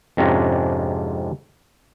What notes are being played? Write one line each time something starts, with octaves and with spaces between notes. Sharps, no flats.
F2 G#2 C3 C#4 D4 A#5